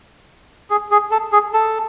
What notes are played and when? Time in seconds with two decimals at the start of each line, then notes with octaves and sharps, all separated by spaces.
0.70 G#4
0.91 G#4
1.11 A4
1.32 G#4
1.54 A4